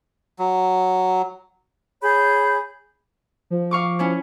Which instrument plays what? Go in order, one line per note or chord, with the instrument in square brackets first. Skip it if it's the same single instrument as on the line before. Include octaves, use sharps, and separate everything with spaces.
[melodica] F#3
[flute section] G#4 C#5 B5 G6
[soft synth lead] F3
[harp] F5 C#6 D6
C#4 E4 C#5